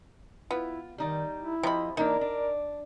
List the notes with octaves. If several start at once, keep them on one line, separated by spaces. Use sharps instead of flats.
B3 E4 F4
D#3 G3 D#4 D5
E4
C3 F3 C5 D#5 B5
E3 A#3 D4 D#4 A#4
D4